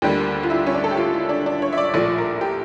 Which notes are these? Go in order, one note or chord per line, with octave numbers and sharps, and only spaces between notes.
D2 D3 G3 A#3 G4
F4
E4
C#4
D4
A4
G4
F4
E4
D4
D4
C#5
E5
D5
A#1 A2 F3 A3 D5
A#4
G4